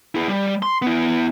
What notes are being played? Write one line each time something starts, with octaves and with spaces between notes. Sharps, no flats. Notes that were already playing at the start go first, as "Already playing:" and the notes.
E4 G#4
G3
C6
B3 E4